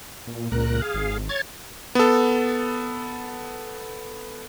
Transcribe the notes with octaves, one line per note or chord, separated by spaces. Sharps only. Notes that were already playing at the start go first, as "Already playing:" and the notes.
A#2
C#2 A#2 A#4 F#6
G#4 F5
G#1
C#5 G#6 A6
B3 A4